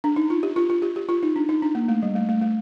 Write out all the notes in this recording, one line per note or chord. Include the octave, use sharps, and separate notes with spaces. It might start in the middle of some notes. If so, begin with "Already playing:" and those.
D4
D#4
F4
G4
F4
F4
G4
G4
F4
D#4
D4
D#4
D4
A#3
A3
G3
A3
A3
A3